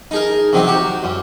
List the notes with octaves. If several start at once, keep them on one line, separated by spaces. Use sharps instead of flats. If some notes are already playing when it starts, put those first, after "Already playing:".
D#4 G#4 A#4
C3 D#3 F#3 D#4
F#4 G4
F#2